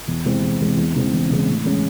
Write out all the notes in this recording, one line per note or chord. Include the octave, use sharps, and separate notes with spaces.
E2
C3 E3 G#3 C4
E2
C3 E3 G#3 C4
E2
C#3 E3 G#3 C4
E2
C#3 E3 G#3 C4
A2
E3 G#3 C#4